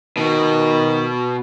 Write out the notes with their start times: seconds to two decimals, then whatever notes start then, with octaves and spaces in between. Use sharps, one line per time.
0.17 B2 D#3 F#4